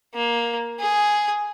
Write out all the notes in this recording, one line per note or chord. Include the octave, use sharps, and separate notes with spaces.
A#3
G#4